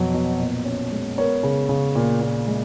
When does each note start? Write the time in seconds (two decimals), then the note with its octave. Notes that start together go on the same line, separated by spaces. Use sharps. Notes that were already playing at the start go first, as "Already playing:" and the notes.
Already playing: F2 B2 F#3
0.14 B2
0.39 A#2
0.65 C#4
0.92 G#3
1.18 B3 A#4 C#5
1.43 C#3
1.69 C#3
1.95 A#2
2.21 A#2
2.48 G#3